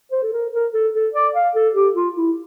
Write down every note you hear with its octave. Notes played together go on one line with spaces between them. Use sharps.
C5
A4
A#4
A#4
A4
A4
D5
F5
A4
G4
F4
E4